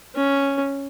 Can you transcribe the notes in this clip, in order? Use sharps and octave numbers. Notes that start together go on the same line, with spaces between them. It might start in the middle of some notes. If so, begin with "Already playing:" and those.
C#4